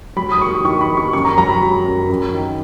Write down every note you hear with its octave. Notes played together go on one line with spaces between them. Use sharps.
F#3 B5
D#6
D#2 C#6
D#3 C#6
B5
D#2
C#6
F#2 C#6
A#5
F#3 A#5
B5
F#3
F#2
F#2
D#3